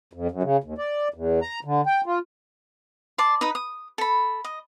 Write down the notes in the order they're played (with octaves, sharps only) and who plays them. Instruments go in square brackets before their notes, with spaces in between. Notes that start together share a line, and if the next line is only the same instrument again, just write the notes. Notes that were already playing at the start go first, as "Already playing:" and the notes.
[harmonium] F2
F#2
C#3
D#2
D5
E2
A#5
D3
G5
F4
[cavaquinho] D5 A5 C6
D#4 B4 D#6
D#6
A4 B5
D#5